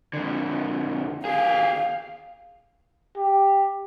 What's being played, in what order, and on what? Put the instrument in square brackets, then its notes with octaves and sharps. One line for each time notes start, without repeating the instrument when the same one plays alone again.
[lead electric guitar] F2 D3
[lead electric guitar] G4 G#4 [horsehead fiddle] F5
[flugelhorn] G4